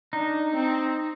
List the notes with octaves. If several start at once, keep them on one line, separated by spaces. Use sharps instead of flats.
D4 D#4
C4